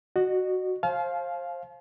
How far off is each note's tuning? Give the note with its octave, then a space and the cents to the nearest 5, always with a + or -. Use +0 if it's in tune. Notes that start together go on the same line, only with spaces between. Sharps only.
F#4 +0 D#5 -40
C5 +30 F5 +0 A5 -45